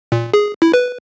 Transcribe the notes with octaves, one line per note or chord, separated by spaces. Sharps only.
A#2
G#4
E4
B4